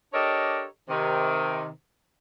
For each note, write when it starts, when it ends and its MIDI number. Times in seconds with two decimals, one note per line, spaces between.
0.13 0.64 62
0.13 0.64 67
0.13 0.64 69
0.13 0.64 70
0.13 0.64 73
0.13 0.64 75
0.88 1.67 48
0.88 1.67 51